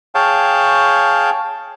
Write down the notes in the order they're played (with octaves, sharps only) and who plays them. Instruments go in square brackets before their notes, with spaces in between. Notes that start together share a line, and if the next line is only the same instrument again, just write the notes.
[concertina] G#4 C#5 F5 G5 A5